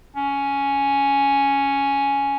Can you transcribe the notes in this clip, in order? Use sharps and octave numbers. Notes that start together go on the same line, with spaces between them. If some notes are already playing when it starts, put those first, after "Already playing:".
C#4